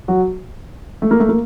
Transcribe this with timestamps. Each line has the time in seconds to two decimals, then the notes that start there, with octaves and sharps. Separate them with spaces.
0.08 F#3 F#4
1.02 A3
1.11 A#3
1.20 A3
1.29 A#3